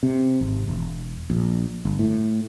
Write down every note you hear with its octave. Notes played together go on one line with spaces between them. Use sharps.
C3
G#1
E1
A#1
G1
A2